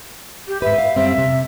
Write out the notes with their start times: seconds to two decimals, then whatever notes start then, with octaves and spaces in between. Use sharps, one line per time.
0.48 G4
0.62 G#2 B4 E5
0.78 F5
0.96 F#2 G3 C4 E5
1.18 C3